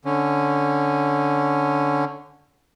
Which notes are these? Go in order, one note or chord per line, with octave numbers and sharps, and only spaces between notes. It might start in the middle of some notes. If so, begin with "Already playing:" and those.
D3 C#4